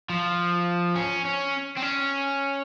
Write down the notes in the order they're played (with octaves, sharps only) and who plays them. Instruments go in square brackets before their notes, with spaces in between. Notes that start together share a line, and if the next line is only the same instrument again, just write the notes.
[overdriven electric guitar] F3
C#4
C#4
C4
C#4